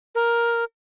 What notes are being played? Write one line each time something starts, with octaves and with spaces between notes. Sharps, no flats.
A#4